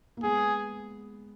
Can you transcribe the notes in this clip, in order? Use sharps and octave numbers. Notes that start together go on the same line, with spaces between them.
A#3
G#3 B3 G#4